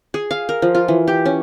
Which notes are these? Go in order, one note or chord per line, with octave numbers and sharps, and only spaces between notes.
G#4
F5
A#4
F3
F4
E3
G4
C#4